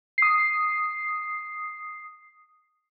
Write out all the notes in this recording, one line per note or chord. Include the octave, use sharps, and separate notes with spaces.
D#6 C7